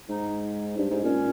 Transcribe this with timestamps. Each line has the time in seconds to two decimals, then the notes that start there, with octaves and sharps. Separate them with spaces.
0.09 G#2 D#4
0.78 G2
0.90 G#2
1.03 A#2 C#4